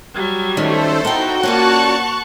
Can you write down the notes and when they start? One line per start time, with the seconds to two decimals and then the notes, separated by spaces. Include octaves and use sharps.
0.14 F#3 G3
0.57 D#3 A3 C#4 A4 C5 D5
1.05 B3 D#4 E4 F#4 G5
1.43 A#3 C#4 F4 D5 A5 C#6 F#6